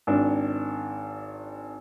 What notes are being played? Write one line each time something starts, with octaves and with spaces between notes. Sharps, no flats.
G#1 D#3 D4